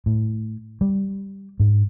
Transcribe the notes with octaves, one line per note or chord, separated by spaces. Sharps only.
A2
G3
G#2